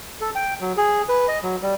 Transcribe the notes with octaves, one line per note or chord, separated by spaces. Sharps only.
A4
G5
F#3
G#4
B4
D#5
F#3
G3